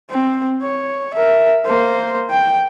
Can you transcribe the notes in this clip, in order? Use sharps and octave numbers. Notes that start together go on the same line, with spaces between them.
C4
C#5
A#4 E5
A#3 C5
G5